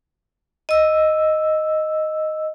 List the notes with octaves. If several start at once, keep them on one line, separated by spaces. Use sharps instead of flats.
D#5 E6